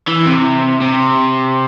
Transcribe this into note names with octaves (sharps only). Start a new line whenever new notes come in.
E3
C3
C3